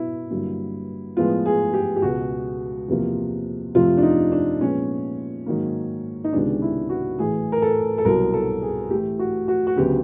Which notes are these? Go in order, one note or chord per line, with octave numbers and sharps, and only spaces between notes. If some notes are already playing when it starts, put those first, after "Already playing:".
Already playing: B2 B3 E4
G2 D3 F#3 A#3
A2 F3 G#3 B3 F4
G#4
G4
G4
C#2 B2 G#3 F#4
E2 C3 F3 A#3
F2 C3 F3 A3 F4
D4
D#4
D4
A#2 F3 G#3 B3 C#4
G#2 D#3 F#3 A#3
D#4
C#2 C3 D#3 G#3 B3 D4
E4
F#4
A2 E3 A3 G#4
A#4
A4
A4
C2 B2 F#3 A#4
A4
G#4
A2 E3 A3 G4
F#4
F#4
F#4
D2 C#3 F#3 B3 G4